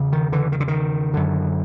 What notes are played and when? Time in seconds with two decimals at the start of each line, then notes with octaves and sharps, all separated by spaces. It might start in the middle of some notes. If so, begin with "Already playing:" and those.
Already playing: E2 C#3
0.13 D#3
0.32 D3 E3
0.52 D#3
0.60 D3
0.68 D#3
1.13 F#2 D3